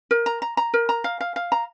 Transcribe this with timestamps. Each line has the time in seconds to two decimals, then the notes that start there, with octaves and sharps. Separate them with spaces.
0.11 A#4
0.26 A#5
0.42 A#5
0.57 A#5
0.74 A#4
0.89 A#5
1.04 F5
1.21 F5
1.36 F5
1.52 A#5